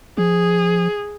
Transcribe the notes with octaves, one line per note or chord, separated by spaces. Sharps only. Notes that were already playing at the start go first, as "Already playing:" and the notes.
F3 G#4